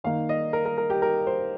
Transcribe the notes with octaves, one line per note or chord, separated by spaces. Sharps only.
D#3 A#3 D#4 F5
D#5
A#4
A#4
A#4
G4
A#4
C5